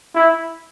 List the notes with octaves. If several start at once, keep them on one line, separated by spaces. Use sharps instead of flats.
E4